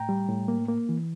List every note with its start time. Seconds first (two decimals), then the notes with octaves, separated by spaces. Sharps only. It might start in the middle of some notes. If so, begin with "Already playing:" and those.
Already playing: A2 G5 A#5
0.09 G3
0.29 A2
0.48 A#3
0.68 A#3
0.89 E3